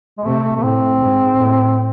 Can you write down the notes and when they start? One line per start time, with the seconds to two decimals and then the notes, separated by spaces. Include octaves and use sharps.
0.18 G#3
0.24 C3 A3
0.43 A3
0.56 A3
0.62 A2 C4
1.00 G#2
1.39 A2